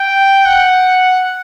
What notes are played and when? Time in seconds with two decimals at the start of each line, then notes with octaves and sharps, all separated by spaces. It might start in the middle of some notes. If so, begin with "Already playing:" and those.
Already playing: G5
0.46 F#5